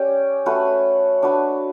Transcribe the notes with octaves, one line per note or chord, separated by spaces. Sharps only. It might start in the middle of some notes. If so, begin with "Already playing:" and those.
Already playing: C#4 G4 D5
A3 C#4 F#4 B4
D4 F#4 B4